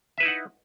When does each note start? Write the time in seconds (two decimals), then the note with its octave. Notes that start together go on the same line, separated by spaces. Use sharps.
0.18 E5
0.20 B4
0.23 E4
0.25 D#4
0.28 F#5